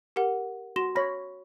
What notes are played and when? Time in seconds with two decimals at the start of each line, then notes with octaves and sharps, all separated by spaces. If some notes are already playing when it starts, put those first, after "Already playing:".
0.16 G4 A#4 F#5
0.76 F#4 C6 A#6 E7
0.95 C#5 B5 F6 A#6